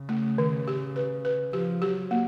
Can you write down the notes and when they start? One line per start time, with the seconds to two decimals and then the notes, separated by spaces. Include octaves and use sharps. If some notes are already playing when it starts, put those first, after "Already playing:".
Already playing: C#3
0.09 A3
0.38 D#3
0.68 G4
0.96 B4
1.25 B4
1.53 F3 G4
1.82 F#3 G4
2.11 A#3